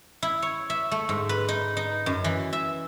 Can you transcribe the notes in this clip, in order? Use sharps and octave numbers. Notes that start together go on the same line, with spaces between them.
E4
C#5
E5
A3
G#2
B4
D#4
D#4
F#2
E3
E5